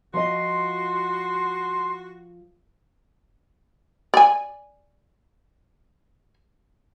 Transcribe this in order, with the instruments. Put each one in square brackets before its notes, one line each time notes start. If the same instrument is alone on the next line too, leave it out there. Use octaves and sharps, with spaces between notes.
[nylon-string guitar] F3 F4 D#5 [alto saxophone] F#4 [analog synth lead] C6
[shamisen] D5 G#5